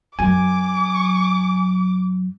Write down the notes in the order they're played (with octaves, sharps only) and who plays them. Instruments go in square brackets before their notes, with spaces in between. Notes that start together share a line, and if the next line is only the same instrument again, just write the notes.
[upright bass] F#2 F#3 [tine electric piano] G#5 [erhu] D6